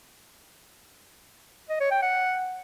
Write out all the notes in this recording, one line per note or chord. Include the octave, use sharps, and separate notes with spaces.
D#5
C#5
G5
F#5